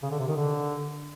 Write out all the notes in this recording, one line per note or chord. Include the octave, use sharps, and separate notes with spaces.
C#3
D3
C3
D#3
D3